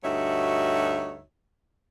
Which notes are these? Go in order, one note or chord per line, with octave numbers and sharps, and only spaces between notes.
D2 G2 D#4 F#4 C#5 E5